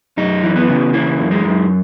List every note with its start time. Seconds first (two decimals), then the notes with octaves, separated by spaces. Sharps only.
0.17 F#2 D#4
0.43 E3
0.56 B3
0.68 C#3
0.93 E3 A#3
1.19 F#2
1.31 G#3
1.44 F#2